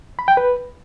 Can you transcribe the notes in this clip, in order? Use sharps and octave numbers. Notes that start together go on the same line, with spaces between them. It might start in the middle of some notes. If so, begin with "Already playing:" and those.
B5
G5
B4